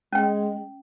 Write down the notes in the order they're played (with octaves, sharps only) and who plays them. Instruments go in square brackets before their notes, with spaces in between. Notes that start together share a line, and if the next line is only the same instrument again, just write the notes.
[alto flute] G#3 [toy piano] C#4 G5